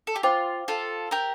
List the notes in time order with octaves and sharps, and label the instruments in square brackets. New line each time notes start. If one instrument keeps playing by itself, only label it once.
[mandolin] A4
G4
[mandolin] F4 [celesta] C5 G5 D6
[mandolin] F4 A4
G4 A#4